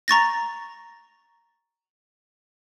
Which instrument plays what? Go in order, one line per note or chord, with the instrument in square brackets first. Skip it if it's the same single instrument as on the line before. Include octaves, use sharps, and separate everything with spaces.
[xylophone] A#5 C#6 A6 A#6